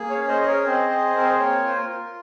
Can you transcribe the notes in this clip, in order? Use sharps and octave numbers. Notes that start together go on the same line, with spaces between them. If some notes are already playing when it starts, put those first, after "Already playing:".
Already playing: A#3 G#4
C#5 F5
C#4
C5 D#5
G#4 D#5
A#4 C#5
C4 C5 D#5
G#4
C4 A#4
C5
A#3 A#4 C#5
F4 C5
A#4
F4